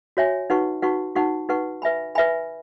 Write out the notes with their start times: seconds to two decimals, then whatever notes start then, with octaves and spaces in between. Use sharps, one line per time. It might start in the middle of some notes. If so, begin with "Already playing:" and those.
0.17 F#4 C#5 E5 G#5
0.50 D#4 F#4 B4 F#5 C#6
0.82 D#4 F#4 B4 F#5 C#6
1.15 D#4 F#4 B4 F#5 C#6
1.49 D#4 F#4 B4 F#5 C#6
1.82 B4 E5 G#5 B5
2.15 B4 E5 G#5 B5